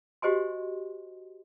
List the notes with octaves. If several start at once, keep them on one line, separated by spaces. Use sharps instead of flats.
F#4 G4 C5 D#5 G#5 C6